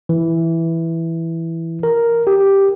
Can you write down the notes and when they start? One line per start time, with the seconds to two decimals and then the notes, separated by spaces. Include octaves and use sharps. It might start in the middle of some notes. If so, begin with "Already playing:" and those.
0.09 E3
1.83 A#4
2.27 G4